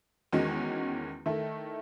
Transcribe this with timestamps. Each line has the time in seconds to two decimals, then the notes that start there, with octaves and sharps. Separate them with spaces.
0.32 E2 D#3 G#3 C#4 F#4
1.26 D#3 A3 E4 A4